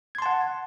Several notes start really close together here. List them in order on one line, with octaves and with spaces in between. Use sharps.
G#6 C6 A5 F#5